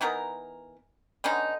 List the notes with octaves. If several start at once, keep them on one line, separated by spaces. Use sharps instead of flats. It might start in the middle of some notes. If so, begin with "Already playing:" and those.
E3 B3 D#4 A#4
D3 B3 C#4 D#4